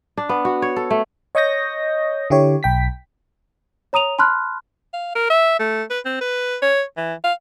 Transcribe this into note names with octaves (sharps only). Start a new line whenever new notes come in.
D4
B3
F#4
C#5
A4
A3
C#5 D#5 C#6 D#6 G6 A#6
D3 E4 G4 C#5
B1 G5 B6
C#5 A#5 D#6 D#7 F7
A5 B5 C6 F6 F#6
F5
A#4
E5
A3
B4
C4
B4
C#5
E3
F5